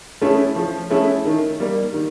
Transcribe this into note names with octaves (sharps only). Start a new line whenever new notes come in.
A3 C#4 E4 G#4
F3
A3 C#4 E4 G#4
D#3
G3 A#3
D#3